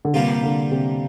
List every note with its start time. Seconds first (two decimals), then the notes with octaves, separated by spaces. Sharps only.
0.05 D3
0.14 G2 C3 G3 A#3 F4
0.43 D3
0.71 C3